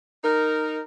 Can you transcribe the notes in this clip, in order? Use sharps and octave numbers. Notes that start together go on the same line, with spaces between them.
D#4 A#4